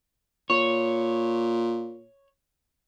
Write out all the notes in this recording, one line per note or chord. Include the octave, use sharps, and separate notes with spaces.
A#2 C#5